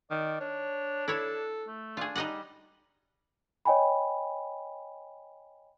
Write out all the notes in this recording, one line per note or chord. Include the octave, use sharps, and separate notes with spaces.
D#3 D5
D4 C#5
E4 A4 C#5
A3
D4 F4 G#4
G3 D#4 D#5 F#5
C#5 D#5 G5 G#5 B5